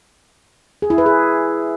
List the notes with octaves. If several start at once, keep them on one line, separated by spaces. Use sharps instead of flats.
G#4
E4
B4
G#4